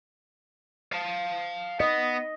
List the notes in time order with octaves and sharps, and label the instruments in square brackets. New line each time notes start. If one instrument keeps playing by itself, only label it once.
[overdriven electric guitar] F5 A5
[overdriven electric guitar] B3 [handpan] D#5